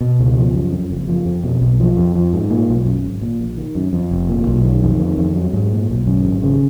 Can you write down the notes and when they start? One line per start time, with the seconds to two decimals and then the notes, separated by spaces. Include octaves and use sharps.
0.01 B2
0.19 C#2
0.37 F3
0.54 F#2
0.72 F2
0.90 F#1
1.08 F3
1.25 F2
1.44 B2
1.61 B1
1.80 F3
1.97 F2
2.15 F3
2.33 G#2
2.50 A#2
2.69 B1
2.86 F#2
3.04 G#1
3.22 A#2
3.40 A#1
3.58 D#3
3.75 F#2
3.93 F2
4.11 F1
4.28 A#2
4.47 B1
4.65 D#3
4.83 F2
4.99 D#3
5.18 F2
5.35 F#3
5.53 G#2
5.72 A#2
5.90 B1
6.06 F#2
6.25 G#1
6.43 C#3